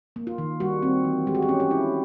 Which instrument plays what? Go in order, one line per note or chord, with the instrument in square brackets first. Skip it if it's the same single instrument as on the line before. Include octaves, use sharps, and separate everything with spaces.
[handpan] A#3
F4
D#3
G3 F#4
C4
E3
G#3 G4
F#4
G4
C#4
G4
E4